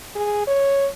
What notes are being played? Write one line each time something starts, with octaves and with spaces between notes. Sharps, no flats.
G#4
C#5